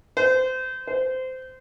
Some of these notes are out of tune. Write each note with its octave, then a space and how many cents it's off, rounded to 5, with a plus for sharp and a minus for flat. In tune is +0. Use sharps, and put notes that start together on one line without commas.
C5 -25
C5 -20